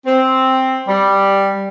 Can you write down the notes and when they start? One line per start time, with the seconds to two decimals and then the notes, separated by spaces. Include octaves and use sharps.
0.06 C4
0.88 G3